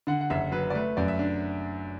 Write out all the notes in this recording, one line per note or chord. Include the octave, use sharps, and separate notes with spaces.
D3 F#5
F#5
F#1 E5
F#3 B4
D5
A3 B4
F#2 D5
E5
D4